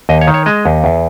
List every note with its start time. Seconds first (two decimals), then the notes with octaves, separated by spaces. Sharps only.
0.09 D#2 D#5
0.21 C#5
0.27 D#3
0.34 C#5
0.46 G#3 D#5
0.65 D#2
0.84 E2